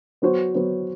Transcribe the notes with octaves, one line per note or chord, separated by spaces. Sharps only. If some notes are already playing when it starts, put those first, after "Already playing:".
F#3 B3 F#4 C5
F#3 B3 F#4 C5